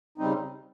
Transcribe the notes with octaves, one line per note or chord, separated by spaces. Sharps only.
C#3 G3 C4 D#4